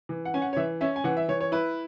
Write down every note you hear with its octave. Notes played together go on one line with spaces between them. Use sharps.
E3
F#5
C#4 G#5
F#5
C#5
E3 E5
C#4 E5
G#5
E3 F#5
E5
E3 C#5
C#5
E4 B4